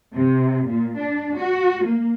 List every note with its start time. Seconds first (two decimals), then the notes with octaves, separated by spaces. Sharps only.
0.14 C3
0.66 A#2
0.97 D4
1.36 F#4
1.84 A#3